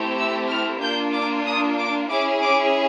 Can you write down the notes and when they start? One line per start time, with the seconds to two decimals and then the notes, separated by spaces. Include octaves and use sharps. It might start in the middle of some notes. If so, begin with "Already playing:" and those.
Already playing: A3 C4 E4 G4
0.18 E6
0.49 F6
0.81 A#3 D4 F4 G6
1.13 D6
1.45 D#6
1.78 D6
2.09 C#4 E4 G#4 D6
2.41 D6